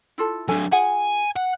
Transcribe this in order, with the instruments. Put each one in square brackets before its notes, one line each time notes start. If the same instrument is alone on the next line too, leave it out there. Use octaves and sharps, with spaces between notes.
[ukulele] E4 F4 A4
[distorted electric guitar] F#3 D4 [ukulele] A4 G#5
[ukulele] F4 G#4 F#5 [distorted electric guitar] G#5
[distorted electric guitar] F#5